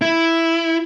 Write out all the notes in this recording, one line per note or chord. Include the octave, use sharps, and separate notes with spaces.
E4